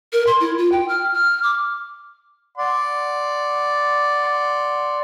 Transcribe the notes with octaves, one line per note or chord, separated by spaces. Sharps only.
A#4
C6
E4
F4
G5
F6
F6
D6
D5 F#5 C6